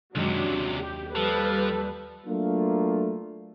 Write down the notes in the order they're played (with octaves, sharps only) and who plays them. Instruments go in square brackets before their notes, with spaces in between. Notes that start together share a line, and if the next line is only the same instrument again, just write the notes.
[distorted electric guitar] C#2 C3 [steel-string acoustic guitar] F#2 D#3 G#3 [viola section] F#3 D4
[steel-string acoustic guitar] D#2
[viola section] G4
[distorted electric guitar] F3 [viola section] G3 B4 [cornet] A4
[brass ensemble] F#3 A3 A#3 D4 F4